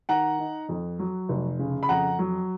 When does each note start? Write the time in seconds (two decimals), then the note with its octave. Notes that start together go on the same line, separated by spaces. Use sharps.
0.09 D#3 F#5 A#5
0.39 D#4
0.69 F2
0.99 F#3
1.29 F1
1.59 C#3
1.83 B5
1.89 F2 F#5 A#5
2.19 F#3